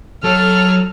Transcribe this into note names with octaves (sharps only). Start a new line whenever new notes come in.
F#3 A4 C#5 F6